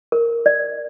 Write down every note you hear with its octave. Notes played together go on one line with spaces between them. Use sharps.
A#4
D5